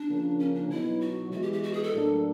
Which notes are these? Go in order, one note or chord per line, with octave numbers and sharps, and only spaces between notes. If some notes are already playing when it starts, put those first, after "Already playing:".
Already playing: D4
C#3 F3 A#3
C#4
D4
B2 F#3 B3 D#4 E4
F#4
E3 G#3 B3 E4 F#4
G4
G4
F#4
G#4
A4
A2 F#3 A#3 D4